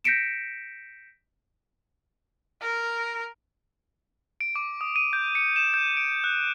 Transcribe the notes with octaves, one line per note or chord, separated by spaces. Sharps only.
G6 A#6 B6 C#7 D7 E7
A#4
D7
D6
D#6
D#7
G6
C#7
E7
G6
D7
F#6